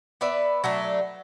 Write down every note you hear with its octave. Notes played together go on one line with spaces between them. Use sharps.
B3 B4 D5 E5
F#3 A3 D4